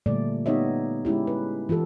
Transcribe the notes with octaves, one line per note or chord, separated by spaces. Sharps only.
A#2 D3 G3 A3 D5
B3 D#4 G4 C#5 D#5 E5
G#3 C#4 E4 G4
B4
E3 F4 G4 A4